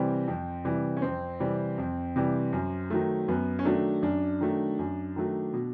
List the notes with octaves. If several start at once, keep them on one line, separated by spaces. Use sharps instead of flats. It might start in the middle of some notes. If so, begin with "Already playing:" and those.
Already playing: C3 E3 G3 C4
F2
C3 E3 G3
C#4
F2 C4
C3 E3 G3
F2
C3 E3 G3
F#2
D#3 F#3 A3
F#2 B3
C#4
D#3 F#3 A3 D4
F#2 D4
D#3 F#3 A3
F#2
D#3 F#3 A3
B2